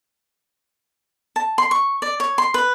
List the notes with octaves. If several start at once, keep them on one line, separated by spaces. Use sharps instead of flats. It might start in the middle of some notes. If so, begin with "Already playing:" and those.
A5
C6
C#6
D5
C#5
C6
B4